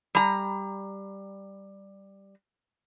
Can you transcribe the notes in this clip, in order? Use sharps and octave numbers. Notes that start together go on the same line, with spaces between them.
G3 A#5